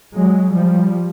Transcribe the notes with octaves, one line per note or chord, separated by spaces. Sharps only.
F#3 G#3
F3 G3